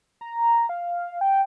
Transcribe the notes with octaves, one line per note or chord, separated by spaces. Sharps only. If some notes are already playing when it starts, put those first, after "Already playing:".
A#5
F5
G5